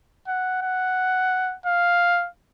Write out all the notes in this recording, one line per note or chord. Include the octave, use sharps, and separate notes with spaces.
F#5
F#5
F5